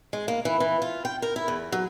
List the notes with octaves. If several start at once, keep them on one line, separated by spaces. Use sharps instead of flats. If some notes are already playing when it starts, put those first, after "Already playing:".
G#3
A#3
E3
E3
F4
G5
A#4
E4
E2
F#3